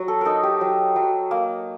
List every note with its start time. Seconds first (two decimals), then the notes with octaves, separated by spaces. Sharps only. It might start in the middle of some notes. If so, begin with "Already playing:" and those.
Already playing: F#3 F#4
0.08 A4
0.21 D#4 A4 A#4
0.43 G4
0.61 F#3
0.96 F#3
1.31 A#3